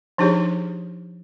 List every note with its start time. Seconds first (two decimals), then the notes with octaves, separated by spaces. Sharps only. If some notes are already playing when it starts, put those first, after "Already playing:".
0.18 F3 D4 D#4 G4 G#4 C#5